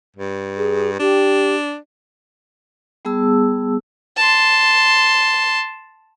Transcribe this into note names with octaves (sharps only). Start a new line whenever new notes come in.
G2
G#4
D4 G4
G3 B3 G#4 A5 E6
A5 C6